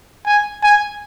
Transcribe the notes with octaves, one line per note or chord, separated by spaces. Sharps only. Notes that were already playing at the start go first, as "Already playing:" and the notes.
G#5
G#5